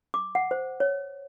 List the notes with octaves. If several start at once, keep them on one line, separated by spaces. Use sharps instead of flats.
D6
F#5
C5
C#5